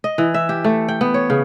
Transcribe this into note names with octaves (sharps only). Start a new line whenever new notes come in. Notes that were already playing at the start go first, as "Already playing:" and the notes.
D#5
E3
E5
G4
A3
G5
B3
C#5
C#3